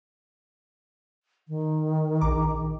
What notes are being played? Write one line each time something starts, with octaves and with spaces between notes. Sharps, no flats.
D#3
A#1 A#5 D6